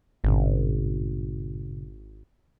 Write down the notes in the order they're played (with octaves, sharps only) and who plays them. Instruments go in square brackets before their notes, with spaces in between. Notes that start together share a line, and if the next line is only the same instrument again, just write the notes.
[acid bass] G#1 [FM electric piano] G2 A#2 C#3